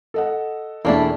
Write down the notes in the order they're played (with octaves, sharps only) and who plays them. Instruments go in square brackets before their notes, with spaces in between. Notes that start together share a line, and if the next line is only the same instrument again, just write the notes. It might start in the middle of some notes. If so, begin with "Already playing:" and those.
[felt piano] A4 D#5 F#5
[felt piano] E1 A3 A5 [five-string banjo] A#3 D4 E4